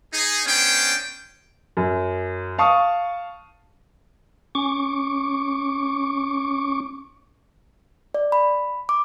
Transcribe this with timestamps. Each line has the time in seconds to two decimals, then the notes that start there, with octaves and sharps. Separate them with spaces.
0.14 D#4 G#4
0.46 B3 C#4 D4 C5 G5
1.77 F#2
2.58 F5 A5 C#6 D#6
4.55 C#4 C#6 D6
8.14 D5
8.32 B5
8.89 D6